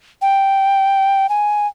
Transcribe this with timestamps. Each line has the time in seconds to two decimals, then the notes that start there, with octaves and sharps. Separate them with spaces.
0.22 G5
1.29 G#5